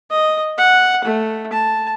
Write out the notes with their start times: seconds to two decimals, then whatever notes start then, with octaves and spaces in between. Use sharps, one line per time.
0.11 D#5
0.58 F#5
1.05 A3
1.53 A5